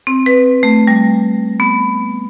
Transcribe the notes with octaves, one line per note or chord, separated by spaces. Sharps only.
C4
B4
A3
G3
B3